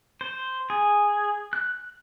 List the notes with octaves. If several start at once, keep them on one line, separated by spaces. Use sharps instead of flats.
C5
G#4
F#6